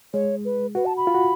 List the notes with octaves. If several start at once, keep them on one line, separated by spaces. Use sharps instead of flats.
G#3 C#5
B4
F#4 B4
A5
B5
F4
F#4